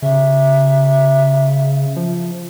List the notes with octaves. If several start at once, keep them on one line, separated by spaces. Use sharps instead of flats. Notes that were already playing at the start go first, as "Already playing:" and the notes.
C#3 E5
F3